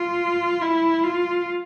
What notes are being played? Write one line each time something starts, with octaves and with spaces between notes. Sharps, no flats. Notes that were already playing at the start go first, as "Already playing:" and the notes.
Already playing: F4
E4
F4